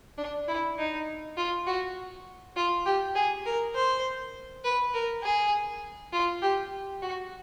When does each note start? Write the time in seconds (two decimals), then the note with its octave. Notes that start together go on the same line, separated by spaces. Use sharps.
0.18 D4
0.48 E4
0.78 D#4
1.37 F4
1.67 F#4
2.56 F4
2.86 G4
3.15 G#4
3.46 A#4
3.75 C5
4.64 B4
4.94 A#4
5.23 G#4
6.13 F4
6.42 G4
7.02 F#4